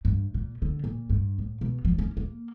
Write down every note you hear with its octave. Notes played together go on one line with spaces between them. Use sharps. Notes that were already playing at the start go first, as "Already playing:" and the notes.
G2
A#2
D3
A#2
G2
A2
B2
F3
C#4
A#3